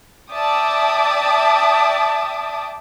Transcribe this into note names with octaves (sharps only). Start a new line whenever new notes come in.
D5 E5 G5 A5 D6 D#6